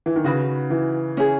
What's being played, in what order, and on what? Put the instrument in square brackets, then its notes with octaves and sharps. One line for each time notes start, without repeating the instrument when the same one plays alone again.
[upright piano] E3
D#3
[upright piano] C#3 [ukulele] D#4 F#4 B4
[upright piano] E3
[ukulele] C#4 E4 G#4